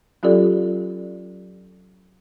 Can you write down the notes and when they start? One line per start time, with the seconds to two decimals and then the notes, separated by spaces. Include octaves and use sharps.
0.23 F#3 C#4 F4 G4 A4 D5